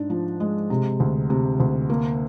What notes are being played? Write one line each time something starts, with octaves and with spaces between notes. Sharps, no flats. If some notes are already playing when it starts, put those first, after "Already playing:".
Already playing: G#2 D4
F3
G#3
C3
D2
C3
D2
A#3